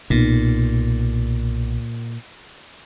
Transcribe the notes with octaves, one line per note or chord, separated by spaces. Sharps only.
B1 A#2